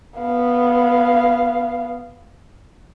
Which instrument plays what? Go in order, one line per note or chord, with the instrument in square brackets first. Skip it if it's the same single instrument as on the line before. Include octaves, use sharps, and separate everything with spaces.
[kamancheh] B3 F5